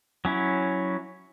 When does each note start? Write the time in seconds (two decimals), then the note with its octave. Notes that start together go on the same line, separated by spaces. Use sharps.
0.25 F#3 C#4 E4